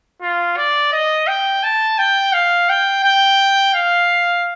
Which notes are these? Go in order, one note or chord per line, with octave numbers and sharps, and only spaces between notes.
F4
D5
D#5
G5
A5
G5
F5
G5
G5
F5